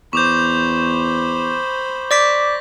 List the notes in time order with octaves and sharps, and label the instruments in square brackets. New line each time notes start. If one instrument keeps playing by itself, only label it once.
[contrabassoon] E2 [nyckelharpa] C5 B5 [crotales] C#6 D6 G6
[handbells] D5 D6 B6 [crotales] A#6